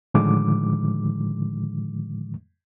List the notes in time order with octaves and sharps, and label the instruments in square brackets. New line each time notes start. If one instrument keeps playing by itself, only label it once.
[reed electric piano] A2 D3 D#3 F3 G#3 D6